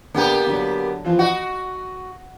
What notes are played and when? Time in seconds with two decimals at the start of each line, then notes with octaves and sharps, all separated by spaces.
0.14 D3 A#3 B3 G4
0.46 D3 F#3
1.05 E3 F3 F4
1.19 F#4 D#5 F#5